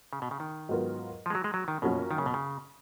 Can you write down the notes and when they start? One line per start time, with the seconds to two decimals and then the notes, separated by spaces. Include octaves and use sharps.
0.13 C#3
0.22 B2
0.31 C#3
0.40 D#3
0.69 G#2 F#3 B3 F4 A#4
1.26 F3
1.30 G#3
1.35 F#3
1.44 G#3
1.54 F#3
1.68 D#3
1.82 F#2 B2 F3 A#3 C#4 F#4
2.11 D#3
2.18 C#3
2.26 B2
2.34 C#3